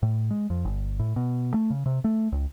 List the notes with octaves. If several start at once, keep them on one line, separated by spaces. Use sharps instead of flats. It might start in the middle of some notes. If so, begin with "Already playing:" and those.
A2
G#3
F2
G1
A2
B2
A3
C#3
C3
A3
C#2